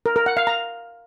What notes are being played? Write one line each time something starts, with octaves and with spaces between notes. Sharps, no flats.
A#4
A#4
F#5
F5
A#5